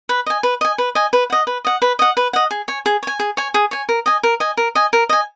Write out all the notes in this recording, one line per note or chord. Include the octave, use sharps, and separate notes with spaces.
B4
D#5 G#5
B4
D#5 G#5
B4
D#5 G#5
B4
D#5 F#5
B4
D#5 F#5
B4
D#5 F#5
B4
D#5 F#5
G#4
C#5 G#5
G#4
C#5 G#5
G#4
C#5 G#5
G#4
C#5 G#5
A#4
D#5 G#5
A#4
D#5 G#5
A#4
D#5 G#5
A#4
D#5 G#5